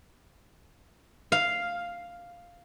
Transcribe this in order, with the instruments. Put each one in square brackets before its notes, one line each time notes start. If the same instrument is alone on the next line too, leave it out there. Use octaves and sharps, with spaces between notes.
[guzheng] F5